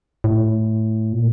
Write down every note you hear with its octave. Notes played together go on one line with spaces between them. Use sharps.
A2
A#2